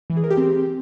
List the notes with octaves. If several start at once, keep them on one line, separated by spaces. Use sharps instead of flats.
E3
G#4
A#4
G4
C4